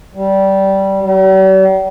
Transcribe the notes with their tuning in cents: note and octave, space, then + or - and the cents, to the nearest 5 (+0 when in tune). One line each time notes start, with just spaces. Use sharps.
G3 -15
G3 -45